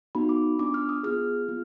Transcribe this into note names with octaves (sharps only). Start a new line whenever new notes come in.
B3 D#4 F#4 B5
D6
B3 D4 F4 D6
F6
D#6
B3 F4 G#4 F6
B3 F4